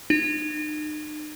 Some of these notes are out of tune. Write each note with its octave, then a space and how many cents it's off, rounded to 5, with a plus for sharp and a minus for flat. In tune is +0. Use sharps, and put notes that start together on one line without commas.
D#4 -40